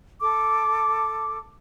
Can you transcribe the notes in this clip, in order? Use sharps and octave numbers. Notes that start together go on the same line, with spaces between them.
A4 D6